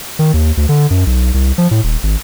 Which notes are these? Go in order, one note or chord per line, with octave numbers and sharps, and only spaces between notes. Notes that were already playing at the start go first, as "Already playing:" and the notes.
D#3
D#2
D2
D3
F#2
B1
C2
F3
A2
D#1
G#1